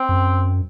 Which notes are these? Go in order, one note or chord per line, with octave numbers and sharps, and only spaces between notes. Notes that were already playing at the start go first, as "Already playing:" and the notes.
Already playing: C4
F#2